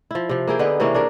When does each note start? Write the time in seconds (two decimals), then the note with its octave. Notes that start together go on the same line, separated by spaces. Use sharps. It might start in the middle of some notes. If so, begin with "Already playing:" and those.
0.11 F3 E4
0.29 C3 F3
0.48 A#3 E4 G#4 G5
0.59 D3 B3 D#4 B4
0.80 C3 E3 A#3 C#4
0.94 D4 G#4 A#4